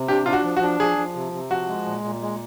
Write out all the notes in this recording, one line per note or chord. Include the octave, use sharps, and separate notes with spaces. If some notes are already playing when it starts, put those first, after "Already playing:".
Already playing: C3
D4 G4
D4 F4
F#4
F3
F#4
D4
F3 G#4
F3
C3
C3
F3 F#4
G#3
A#2
A#2
G#3